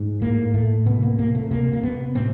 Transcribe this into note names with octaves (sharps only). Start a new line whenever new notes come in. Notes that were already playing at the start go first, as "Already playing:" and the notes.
Already playing: G#2
A2 A#3
A2 A3
C3 B3
A#3
C3 A#3
A3
C3 A#3
A#3
C3 B3
A2 C4